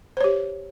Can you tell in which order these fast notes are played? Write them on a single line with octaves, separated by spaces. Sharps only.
C5 C#5 G4